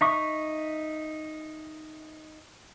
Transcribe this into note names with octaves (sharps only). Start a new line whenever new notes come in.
D#4 E5 C#6 D#6